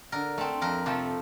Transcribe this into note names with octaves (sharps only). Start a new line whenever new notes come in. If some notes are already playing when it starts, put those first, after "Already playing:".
D3 A#4
A3 C4
F2 A#4
C3 F3 A3